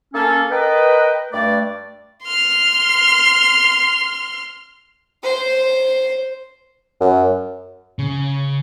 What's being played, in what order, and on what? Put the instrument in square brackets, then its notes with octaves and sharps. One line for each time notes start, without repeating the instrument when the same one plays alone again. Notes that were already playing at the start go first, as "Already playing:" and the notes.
[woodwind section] A#3 C#4 A4
A#4 B4 D#5 G5
G2 A3 D5
[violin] C6 F6
[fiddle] C5
[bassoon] F#2
[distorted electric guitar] C#3